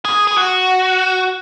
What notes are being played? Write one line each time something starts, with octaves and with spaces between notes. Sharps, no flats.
G#4
G#4
F#4